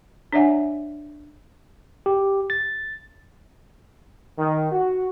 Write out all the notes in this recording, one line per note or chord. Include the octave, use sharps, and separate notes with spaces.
D4 C#5 D5 E5 F#5 G#5
G4
A6
D#3
F#4